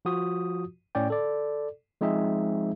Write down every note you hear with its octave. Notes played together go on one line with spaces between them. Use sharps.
F3 F4 F#4 D#6
A2 C#4 D5 G5
A4 D5
F3 G#3 C4 D#4 G#4 E5